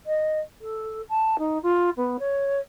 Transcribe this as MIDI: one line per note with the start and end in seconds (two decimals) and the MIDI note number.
0.06 0.40 75
0.61 1.02 69
1.09 1.36 81
1.39 1.58 63
1.63 1.90 65
1.97 2.17 59
2.19 2.60 73